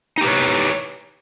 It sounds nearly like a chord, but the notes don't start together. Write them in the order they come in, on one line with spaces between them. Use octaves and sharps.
D#4 G4 B4 C#5